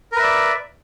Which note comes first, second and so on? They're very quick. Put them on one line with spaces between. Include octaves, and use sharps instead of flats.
A#4 B4 E5 D5